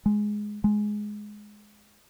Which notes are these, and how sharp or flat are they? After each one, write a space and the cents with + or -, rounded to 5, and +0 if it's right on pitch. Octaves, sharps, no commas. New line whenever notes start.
G#3 +5
G#3 +10